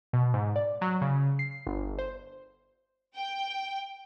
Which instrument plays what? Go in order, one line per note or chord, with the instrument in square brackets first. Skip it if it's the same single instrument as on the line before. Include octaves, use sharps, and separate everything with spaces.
[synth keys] B2
G#2
D5
F#3
C#3
C7
G1
C5
[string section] G5